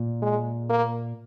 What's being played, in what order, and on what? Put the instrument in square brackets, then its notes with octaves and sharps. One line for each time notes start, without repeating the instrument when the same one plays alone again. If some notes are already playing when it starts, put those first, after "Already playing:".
Already playing: [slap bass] A#2
[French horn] G#3
A#3